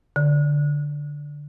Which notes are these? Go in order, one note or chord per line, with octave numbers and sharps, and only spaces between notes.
D3